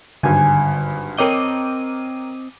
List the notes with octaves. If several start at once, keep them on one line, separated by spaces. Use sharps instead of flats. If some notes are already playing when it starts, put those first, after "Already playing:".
G#1 G2 D3 G#5
C4 A#4 C#5 D#5 G5 D6 D#7